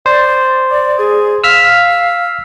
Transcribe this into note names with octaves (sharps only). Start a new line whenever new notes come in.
C5 D5
D5
G#4
F5 E6 F6 B6